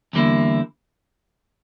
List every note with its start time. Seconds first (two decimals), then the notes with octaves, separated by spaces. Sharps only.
0.13 E2 D3 G3 A#3 E4